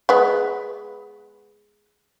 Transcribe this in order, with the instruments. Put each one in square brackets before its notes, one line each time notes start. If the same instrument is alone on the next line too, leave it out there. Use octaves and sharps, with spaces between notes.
[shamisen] G#3 B3